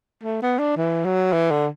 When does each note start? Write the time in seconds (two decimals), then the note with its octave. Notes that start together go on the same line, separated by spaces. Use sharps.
0.23 A3
0.42 B3
0.59 D4
0.77 E3
1.05 F#3
1.32 E3
1.51 D3